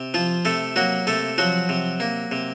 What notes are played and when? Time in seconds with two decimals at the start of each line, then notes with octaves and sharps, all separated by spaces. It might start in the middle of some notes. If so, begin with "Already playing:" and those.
Already playing: C3
0.14 F3 F4
0.45 C3 A3 A4
0.76 F#3 A#3 F#4
1.07 C3 A3 A4
1.38 F3 F#3 F#4
1.69 C3
2.00 A#3
2.31 C3